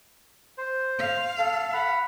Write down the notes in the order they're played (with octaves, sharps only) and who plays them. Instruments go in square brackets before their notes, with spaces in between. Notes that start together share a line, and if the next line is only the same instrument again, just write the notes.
[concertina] C5
[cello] F5
[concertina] A4
F#5 B5